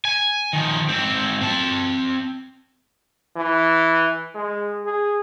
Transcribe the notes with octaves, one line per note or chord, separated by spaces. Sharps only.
G#5
D#3 F3
G#2 C4
C4 A5
E3
G#3
G#4